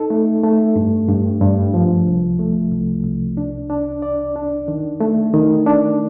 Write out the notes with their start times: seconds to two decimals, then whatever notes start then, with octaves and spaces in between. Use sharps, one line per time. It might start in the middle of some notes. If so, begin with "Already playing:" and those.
Already playing: D#4 A4
0.10 A3
0.44 A3
0.76 G2
1.08 G2
1.41 G2
1.74 F3
2.07 C2
2.39 A3
2.72 C2
3.04 C2
3.37 D4
3.70 D4
4.02 D5
4.36 D4
4.68 D#3
5.00 A3
5.33 D#3
5.66 D4